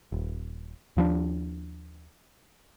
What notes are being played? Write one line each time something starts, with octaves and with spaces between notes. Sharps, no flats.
D#1
D#2 F3 G3 D4